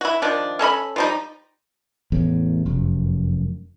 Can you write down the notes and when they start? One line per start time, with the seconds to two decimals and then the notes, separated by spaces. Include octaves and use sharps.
0.01 E4 F#4
0.22 D#3 F3 D4
0.59 C#4 A4 D#5 B5
0.96 F3 G3 D#4
2.12 A1 E2 A2
2.66 F1 F#2